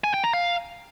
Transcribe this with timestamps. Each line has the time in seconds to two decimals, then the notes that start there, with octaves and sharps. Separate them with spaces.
0.04 G#5
0.14 G5
0.24 A#5
0.33 F5